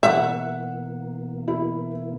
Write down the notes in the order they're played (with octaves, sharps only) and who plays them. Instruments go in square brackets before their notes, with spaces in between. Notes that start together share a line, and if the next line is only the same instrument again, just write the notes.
[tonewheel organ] B2 E3 A#3 [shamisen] E5 [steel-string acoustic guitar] F#5
[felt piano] E4